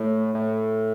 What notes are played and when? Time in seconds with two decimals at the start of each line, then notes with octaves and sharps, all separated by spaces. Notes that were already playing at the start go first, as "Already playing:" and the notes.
Already playing: A2
0.35 A2